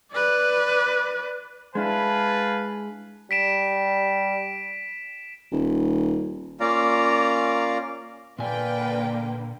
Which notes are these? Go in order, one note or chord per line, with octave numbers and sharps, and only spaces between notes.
B4 D5
G#3 D4 E4 B4 F5 G#5 A5
G3 B6 D7 E7
D#1
A#3 C#4 F4 D5 F5 A#5
A#2 D3 A#3 B4 D5 F5 G5 G#5